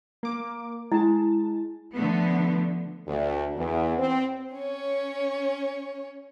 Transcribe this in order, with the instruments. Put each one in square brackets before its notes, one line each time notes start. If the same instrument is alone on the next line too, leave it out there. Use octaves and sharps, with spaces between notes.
[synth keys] A#3 D6
[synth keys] G#3 A5 [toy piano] E4
[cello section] D3 F3 A3 B3
[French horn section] D2
E2
C4
[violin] C#4 C#5